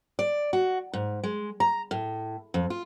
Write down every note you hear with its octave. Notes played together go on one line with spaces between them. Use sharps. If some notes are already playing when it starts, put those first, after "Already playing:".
D5
F#4
G#2
G#3
A#5
A2
F2
F4